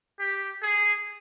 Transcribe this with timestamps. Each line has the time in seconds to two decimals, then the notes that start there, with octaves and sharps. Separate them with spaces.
0.19 G4
0.62 G#4